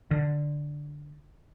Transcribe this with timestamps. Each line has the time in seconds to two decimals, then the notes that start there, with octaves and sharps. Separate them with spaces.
0.11 D3